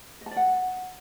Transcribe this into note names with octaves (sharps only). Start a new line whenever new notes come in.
D#5
A5
D5
F#5